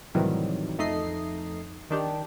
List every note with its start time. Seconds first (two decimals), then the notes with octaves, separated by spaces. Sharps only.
0.14 A2 C3 D#3 E3 F#3 G3
0.78 F2 A3 D#4 D#5 C7
1.90 D#3 D4 G4